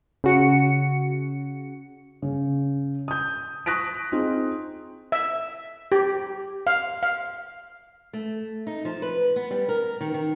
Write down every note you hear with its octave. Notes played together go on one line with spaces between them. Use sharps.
C#3 F#4 C#7
C#3
D#6 G6
C#6 D#6 F#6 A#6 B6 D7
C4 D#4 F4 G#4
E5
G4
F5
F5
A3
D#4
F3
B4
B3
G3
A#4
D#3
D#3